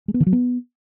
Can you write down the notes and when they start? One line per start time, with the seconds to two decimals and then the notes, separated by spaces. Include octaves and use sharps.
0.08 G#3
0.14 B3
0.20 D#3
0.27 F#3
0.33 B3